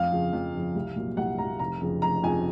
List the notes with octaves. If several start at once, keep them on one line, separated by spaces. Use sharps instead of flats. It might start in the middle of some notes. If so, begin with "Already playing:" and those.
Already playing: F2 F5
C#3 F3
F2
C#3 F3
C2
A#2 F#3
C2 F#5
A#2 F#3 A#5
F1 A#5
F2 C#3 F3
F1 A#5
F2 C#3 F3 G#5